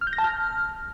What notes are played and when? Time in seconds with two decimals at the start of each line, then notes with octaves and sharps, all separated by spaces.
0.01 F6
0.07 G6
0.13 A#6
0.18 A5
0.24 F6